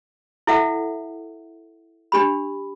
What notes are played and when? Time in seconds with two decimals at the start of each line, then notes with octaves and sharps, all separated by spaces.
0.47 E4 A4 E5 F#5
2.12 D4 G4 B5